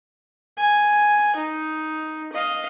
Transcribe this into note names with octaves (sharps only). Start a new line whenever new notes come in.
G#5
D#4
D#5 F5